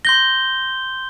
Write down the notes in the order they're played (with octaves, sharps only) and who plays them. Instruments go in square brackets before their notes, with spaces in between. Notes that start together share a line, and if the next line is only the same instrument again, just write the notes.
[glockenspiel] C6 G6 G7 [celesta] A#6